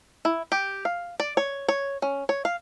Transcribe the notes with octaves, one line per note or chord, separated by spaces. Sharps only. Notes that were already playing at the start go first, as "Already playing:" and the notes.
E4
G4
F5
D5
C#5
C#5
C#4
C#5
F5